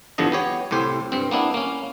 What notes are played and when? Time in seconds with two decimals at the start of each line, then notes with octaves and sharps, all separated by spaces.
0.18 E2 G2 D3 F3 D#5
0.32 B3 G4 C#5
0.71 C2 A2 G4 C5
1.12 G2 C4
1.31 A#3 B3 D4 E4
1.54 A#3 C#4